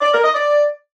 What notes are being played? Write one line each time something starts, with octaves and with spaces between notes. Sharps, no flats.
D5
A#4
D#5
D5